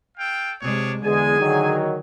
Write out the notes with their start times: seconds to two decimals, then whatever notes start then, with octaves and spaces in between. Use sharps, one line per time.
0.17 A4 F5 G5
0.61 C3 G#3 D4 G#4 C#5
1.04 E2 D3 G#3 G#4 G#5
1.39 D#3 F#3